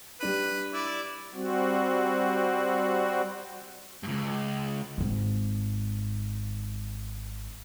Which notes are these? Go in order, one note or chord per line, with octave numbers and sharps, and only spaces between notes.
G3 D4 B4 D#7
E4 D5
G3 C4 F#4
C#2 G2
G#1 G#2